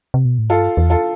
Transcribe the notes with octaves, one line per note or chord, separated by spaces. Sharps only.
C3
B2
A2
G2 F4 A4
E2
F4 A4